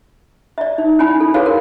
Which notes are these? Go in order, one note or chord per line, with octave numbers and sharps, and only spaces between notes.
D5 E5
D#4
C#4 E4 G#5 B5
A4
F#4 G#4 A4 B4 C#5 F5
A#4